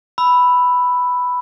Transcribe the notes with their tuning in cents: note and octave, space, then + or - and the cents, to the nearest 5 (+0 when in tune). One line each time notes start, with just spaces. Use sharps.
B5 +0 E6 +0